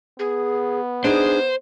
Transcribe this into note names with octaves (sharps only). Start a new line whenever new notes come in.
B3 G#4
D4 D#4 G#4 C5